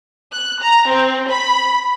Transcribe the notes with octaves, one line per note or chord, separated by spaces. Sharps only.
F#6
A#5
C4
B5